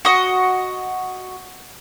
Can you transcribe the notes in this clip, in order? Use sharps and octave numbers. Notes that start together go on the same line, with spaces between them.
F#4 D#5